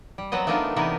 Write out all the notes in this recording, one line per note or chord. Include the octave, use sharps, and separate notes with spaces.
G3
F#3 B3 C4 D#5
A3 B3 D4 D#4 F4 A#4
C3 E3 B3 D4 D#4 A#4